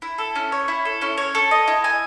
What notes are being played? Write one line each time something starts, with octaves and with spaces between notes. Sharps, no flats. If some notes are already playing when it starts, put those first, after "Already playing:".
E4
A4
C#4
C#5
E4
A4
C#4
C#5
A4
D#5
E4
G#5